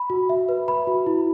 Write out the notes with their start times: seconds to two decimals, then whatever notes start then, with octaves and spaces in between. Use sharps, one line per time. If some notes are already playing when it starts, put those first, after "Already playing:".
Already playing: B5
0.10 F#4
0.29 E5
0.49 B4
0.68 B5
0.87 F#4
1.06 E4